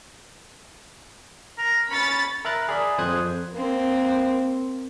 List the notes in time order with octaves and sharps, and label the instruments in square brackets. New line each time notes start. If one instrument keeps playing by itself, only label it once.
[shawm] A#4
[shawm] C#4 [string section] B5 A6
[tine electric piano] A#4 E5 A#5 B5 F#6 A6
G#4 D5 B5
F2 C5 D#6 F#6 G#6
[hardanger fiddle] A#3 C4